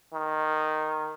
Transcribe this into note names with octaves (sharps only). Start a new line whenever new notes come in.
D#3